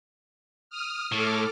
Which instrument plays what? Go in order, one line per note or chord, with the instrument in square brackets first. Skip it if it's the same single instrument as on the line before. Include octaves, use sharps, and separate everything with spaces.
[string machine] D#6 F6
[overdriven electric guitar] A2 [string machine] A4 D6 F6